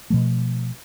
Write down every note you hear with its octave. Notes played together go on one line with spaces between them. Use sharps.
B2 F3 A3